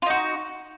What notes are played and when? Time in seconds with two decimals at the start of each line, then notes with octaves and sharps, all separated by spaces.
0.02 F4
0.06 D#4
0.10 F#4